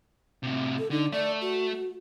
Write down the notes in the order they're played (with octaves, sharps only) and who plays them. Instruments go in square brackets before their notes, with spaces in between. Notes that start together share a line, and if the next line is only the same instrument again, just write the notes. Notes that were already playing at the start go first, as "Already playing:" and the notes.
[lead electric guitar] A2 C3
[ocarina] A4
[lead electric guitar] D3 [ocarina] D#4
[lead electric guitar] A3 [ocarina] D5
[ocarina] F#4